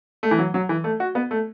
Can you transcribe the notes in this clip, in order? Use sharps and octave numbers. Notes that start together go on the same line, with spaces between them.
A3
E3
F#3
F#3
E3
A3
F#4
B3
A3